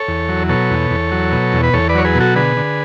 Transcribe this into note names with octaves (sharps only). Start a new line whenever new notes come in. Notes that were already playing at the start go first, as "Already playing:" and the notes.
Already playing: A4 C#5
E2
F#3
B2 A4 C#5
E2
E2
F#3
B2
E2
B4
E2 A4 C#5
B4 D5
F#3 C#5
G#4 B4
B2
F#4 A4
D3 G#4 B4
D3